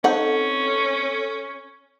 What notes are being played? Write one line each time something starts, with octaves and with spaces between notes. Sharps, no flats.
C4 C#4 D#4 A4 F#5